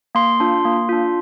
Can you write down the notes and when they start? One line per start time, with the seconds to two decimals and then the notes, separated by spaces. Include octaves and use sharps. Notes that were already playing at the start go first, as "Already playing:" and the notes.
0.15 A#3 C6
0.40 D4 F4
0.65 A#3
0.89 D4 F4